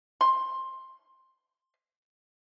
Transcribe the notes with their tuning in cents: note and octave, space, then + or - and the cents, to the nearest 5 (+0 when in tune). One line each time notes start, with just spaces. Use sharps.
C6 +15